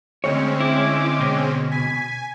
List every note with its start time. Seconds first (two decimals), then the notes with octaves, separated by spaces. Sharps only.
0.24 D2 G#3 C4 C#4 C#5
0.60 E4 D6
1.20 B2
1.71 G#5 B6